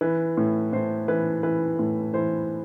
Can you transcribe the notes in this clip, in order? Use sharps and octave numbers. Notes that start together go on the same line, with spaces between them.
E3 B4
A2
A2 C5
E3 B4
E3 B4
A2
E3 C5